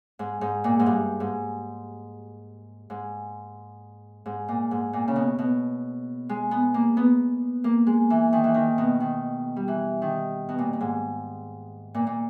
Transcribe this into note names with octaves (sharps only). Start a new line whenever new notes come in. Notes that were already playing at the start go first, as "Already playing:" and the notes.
G#2
G#2
A#2
G#2
G2
G#2
G#2
G#2
A#2
G#2
A#2
C#3
B2
B2
G#3
B3
A#3
B3
A#3
G#3
E3
D#3
E3
D#3
B2
D#3
G3
E3
D#3
B2
A#2
A#2
G#2
A#2
A#2